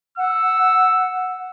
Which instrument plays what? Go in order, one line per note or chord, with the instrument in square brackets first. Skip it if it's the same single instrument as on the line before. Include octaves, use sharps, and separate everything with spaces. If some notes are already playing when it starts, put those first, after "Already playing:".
[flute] F#5 [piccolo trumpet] E6